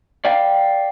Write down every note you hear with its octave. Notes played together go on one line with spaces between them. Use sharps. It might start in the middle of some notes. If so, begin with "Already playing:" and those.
D5 F5 G5